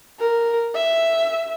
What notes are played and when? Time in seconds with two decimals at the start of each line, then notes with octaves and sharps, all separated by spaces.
0.20 A#4
0.75 E5